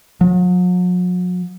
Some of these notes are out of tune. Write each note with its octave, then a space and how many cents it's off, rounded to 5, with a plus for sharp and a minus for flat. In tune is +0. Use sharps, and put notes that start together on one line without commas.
F#3 -45